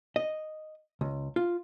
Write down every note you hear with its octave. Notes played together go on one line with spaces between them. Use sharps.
D#5
C#2
F4